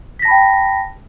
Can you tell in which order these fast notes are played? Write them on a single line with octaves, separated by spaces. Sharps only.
B6 A#6 A5 B5 G5